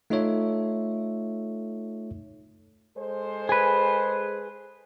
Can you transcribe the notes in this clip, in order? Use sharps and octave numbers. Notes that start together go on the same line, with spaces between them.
A3 D#4 F4 A4 C#5 E5
G#3 A4 C5
G#4 B4